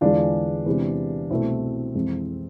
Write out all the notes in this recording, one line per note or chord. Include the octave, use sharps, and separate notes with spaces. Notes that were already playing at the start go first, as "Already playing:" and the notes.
E2 D3 G#3 D4 F4
E2 C3 G#3
C2 B2 A3 C4 E4
F2 E3 G#3